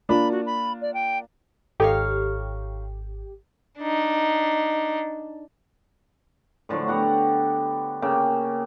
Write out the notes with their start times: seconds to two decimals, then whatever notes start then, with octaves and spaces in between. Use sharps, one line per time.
0.09 A#3 D4 F4 B5
0.32 F#4
0.46 B5
0.82 D5
0.94 G5
1.80 G#1 D#4 G4 A4 C#5 F5
3.79 D4 D#4
6.69 A2 D3 F3 F#3
6.87 B3 G4 F#5 A#5
8.02 C#3 A#3 G5